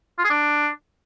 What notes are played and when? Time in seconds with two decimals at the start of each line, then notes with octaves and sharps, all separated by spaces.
0.19 F4
0.25 G#4
0.30 D4